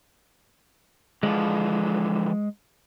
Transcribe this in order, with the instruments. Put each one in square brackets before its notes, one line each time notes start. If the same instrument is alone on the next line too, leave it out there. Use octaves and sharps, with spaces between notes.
[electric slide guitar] D3 E3 F3 [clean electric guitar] G#3